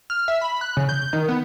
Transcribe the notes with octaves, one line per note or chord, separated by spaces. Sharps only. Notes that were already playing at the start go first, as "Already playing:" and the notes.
F6
E5
B5
F#6
C#3
G6
D#3
B3